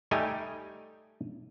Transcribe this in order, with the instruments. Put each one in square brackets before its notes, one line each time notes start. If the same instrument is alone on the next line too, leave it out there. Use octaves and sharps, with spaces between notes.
[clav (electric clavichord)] G3 A3 D#4 G4 G#5